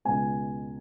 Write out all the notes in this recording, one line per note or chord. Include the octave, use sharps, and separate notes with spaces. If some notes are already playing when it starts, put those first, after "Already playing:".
C#2 B2 G#3 G#5